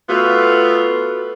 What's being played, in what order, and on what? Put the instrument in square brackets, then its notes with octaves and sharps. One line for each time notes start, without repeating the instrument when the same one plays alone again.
[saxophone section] A3 B3 F4 [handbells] F#4 A4 B4